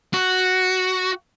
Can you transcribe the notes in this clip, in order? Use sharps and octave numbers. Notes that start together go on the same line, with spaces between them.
F#4